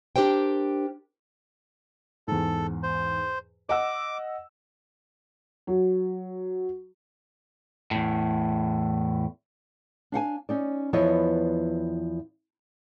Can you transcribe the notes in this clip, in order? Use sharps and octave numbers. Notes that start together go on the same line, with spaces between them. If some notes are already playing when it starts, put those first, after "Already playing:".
D4 G4 A#4 C5 G5
E2 G#2 A4
C5
D#5 F#5 D6 E6
F#3
E2 A2
D4 F5 F#5 G#5
C#4 D#4 D5
E2 F3 B3 E4 C#5 D#5